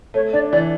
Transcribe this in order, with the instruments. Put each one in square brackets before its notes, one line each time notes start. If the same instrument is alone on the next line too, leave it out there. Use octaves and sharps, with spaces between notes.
[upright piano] A3 [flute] C#5
[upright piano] D4 [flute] D5
[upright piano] E3 [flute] D5